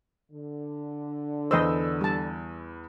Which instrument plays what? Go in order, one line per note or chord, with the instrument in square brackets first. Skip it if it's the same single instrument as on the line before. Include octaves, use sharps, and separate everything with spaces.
[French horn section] D3
[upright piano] E2 B4 E6 [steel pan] C5 D#5
[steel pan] G3 A5